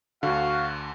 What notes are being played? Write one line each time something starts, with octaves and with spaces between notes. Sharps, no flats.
D2 D3 F#4 F5